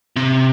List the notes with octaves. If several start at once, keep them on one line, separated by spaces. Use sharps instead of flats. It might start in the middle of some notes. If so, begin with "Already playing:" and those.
C3